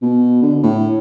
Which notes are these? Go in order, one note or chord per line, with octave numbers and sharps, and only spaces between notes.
B2
D3
A2